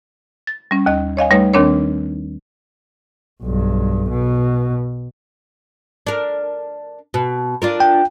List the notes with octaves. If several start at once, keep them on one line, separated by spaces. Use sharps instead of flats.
A6
G3 C#4
D#2 D#5
C#5 D#5 F5 G#5
G3 A3 D#4 B4 C#5
D#2 D#3 C4 D4 A#4 C#5
B1 G2
B2
D4 A#4
B2
D4 F4 A#4
G5